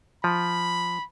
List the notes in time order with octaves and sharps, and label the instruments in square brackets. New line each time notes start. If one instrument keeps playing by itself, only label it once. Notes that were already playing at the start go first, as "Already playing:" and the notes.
[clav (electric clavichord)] F3 [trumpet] B5